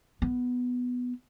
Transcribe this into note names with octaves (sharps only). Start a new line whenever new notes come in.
B3